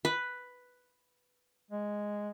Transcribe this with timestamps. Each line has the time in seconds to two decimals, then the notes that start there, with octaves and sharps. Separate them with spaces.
0.05 B4
1.70 G#3